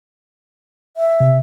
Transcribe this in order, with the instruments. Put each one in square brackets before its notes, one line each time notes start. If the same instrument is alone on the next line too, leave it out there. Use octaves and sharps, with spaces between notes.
[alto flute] E5
[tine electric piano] C3